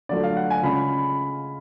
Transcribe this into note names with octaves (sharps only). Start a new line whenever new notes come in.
D3 F#3 A3 D4 F4 D5
F5
F#5
G#5
C#3 G#3 C#4 F4 B5